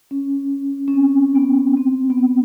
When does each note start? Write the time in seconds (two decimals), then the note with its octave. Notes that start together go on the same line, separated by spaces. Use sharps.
0.11 C#4
0.88 C#4
0.94 C4
1.35 B3
1.77 C4
2.10 B3
2.18 C4